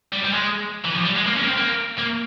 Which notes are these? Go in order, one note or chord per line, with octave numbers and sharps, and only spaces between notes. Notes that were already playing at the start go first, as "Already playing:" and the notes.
G3
G3
G#3
E3
F3
G3
G#3
A#3
C#4
A#3
C4
A#3
A#3